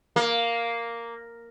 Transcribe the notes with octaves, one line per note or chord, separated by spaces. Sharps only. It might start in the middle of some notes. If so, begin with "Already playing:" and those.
A#3